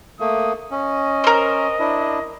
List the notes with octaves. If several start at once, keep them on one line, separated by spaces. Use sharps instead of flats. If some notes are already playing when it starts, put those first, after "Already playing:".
A3 A#3 D#6
C#4 D#5
A#4 C5
D4 E4